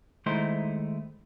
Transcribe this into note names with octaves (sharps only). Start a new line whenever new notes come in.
D#3 G#3 A3 D#4 E4 C5